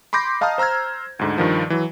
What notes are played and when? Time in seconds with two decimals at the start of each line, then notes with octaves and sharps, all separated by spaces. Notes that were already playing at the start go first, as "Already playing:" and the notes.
0.13 B5 C6 D6 G6 A#6
0.41 D#5 F5 A5 A#5 D#6 F6
0.58 C5 A#5 E6 F6 G#6
1.19 D2 G#2 D3
1.38 G2 D#3 F3
1.70 E3 F#3